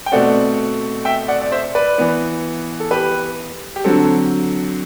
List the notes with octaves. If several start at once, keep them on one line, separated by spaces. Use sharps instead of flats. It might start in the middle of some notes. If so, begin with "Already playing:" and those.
G5
B2 A3 C4 D5 F#5
E5 G5
D5 F#5
D5
C5 E5
B4 D5
E3 B3
A4
G4 B4
G4
D3 F#3 C4 A4